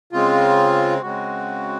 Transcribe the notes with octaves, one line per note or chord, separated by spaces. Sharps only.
C#3 G#3 C4 F4
C#3 G#3 C4 F#4